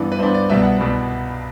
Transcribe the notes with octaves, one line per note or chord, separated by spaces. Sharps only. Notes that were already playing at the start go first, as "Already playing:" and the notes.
Already playing: G2 E3 B3 D4
B4
G2 E3 B3 D4 C5
D5
C2 B2 G3 B3 E5
F#5
C2 B2 G3 B3